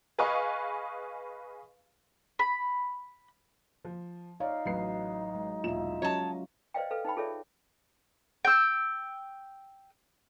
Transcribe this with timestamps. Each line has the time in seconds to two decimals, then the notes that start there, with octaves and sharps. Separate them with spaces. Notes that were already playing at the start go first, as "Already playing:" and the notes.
0.18 G#4 B4 D#5 F5 G#5 C#6
2.39 B5
3.85 F3
4.40 D#4 C#5 D5 F5
4.66 A1 F#3 B4 C7
5.35 G#3
5.64 E1 A#1 F4 E5 E7
6.02 F#3 C#4 F#4 C#5 D#5 A5 A#5
6.74 B4 C5 D5 D#5 F5 G5
6.91 A4 B4 F5
7.05 D#4 B4 G5 B5
7.16 F4 G#4 A4 C#5 D5 E5
8.45 G5 E6